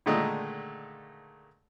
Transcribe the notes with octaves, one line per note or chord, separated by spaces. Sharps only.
A#2 D3 D#3 G#3 A3 D#4